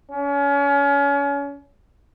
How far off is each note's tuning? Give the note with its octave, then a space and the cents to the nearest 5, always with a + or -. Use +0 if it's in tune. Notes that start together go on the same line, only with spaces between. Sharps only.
C#4 +30